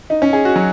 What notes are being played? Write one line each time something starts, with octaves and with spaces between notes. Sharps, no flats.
D#4
C#4
G#4
F#4
F#3